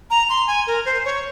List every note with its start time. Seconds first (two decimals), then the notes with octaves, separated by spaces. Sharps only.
0.10 A#5
0.29 C6
0.47 G#5
0.67 A#4
0.85 C5
1.05 C#5